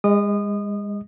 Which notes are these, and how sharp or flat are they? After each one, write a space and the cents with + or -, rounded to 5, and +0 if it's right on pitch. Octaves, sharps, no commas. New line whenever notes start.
G#3 -35 D#5 +15 D#6 -25